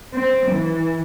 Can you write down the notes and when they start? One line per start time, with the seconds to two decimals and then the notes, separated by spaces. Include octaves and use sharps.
0.13 C4
0.50 E3